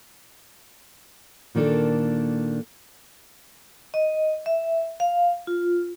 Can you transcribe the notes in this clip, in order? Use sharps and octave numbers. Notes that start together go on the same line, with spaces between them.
A#2 D#3 A#3 D4 A4
D#5
E5
F5
F4